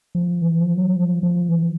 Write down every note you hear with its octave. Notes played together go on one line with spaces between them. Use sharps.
F3
E3
F3
F#3
F3
F3
E3